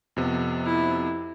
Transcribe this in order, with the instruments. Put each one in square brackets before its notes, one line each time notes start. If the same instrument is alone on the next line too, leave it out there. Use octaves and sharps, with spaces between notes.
[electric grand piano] F2 C3 B3
[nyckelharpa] E4